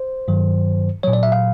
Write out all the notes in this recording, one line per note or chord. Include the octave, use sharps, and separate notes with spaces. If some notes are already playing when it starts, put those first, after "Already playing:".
Already playing: C5
G2 D#3 F#3
A#2 F#3 C#5
D5
E5
F5